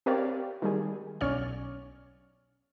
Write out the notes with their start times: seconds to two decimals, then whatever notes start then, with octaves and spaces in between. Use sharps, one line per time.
0.06 C4 G4 A#4 C#5 D5 F5
0.62 D#3 G3 G#4
1.21 B1 C#4 C#5 D5 F6